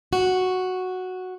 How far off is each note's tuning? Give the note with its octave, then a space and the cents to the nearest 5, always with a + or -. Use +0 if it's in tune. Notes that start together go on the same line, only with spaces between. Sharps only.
F#4 -5